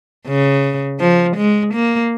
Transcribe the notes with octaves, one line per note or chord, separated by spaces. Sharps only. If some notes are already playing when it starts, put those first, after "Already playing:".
C#3
F3
G#3
A#3